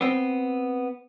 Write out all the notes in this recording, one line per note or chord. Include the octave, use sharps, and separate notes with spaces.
B3 C4